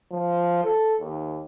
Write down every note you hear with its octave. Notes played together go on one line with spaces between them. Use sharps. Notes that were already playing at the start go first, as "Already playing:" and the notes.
F3
A4
D#2